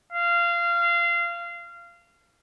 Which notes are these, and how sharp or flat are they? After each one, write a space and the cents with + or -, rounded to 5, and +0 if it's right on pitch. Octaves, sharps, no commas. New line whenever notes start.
F5 -20